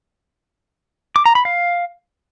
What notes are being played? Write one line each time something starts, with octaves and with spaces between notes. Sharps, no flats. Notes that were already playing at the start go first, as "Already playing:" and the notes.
D6
A#5
B5
F5